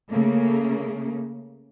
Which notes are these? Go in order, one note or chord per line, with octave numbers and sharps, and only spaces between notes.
C#3 A3 A#3